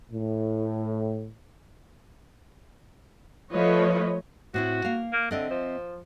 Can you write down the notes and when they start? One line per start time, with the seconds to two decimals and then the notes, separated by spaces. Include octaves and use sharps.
0.12 A2
3.53 F3 A3 B4 C#5 D#5
4.54 A2 C4 E4 F#4
4.85 A#3 F5
5.13 A#3
5.31 D3 C4 D#5 E5
5.50 F3